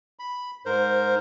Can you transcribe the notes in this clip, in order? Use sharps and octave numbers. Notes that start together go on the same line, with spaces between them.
B5
G#2 A#4 C5